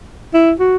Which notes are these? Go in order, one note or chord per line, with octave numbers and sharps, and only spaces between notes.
E4
F#4